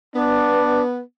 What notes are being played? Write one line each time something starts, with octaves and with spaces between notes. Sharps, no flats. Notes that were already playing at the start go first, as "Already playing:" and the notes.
B3 D4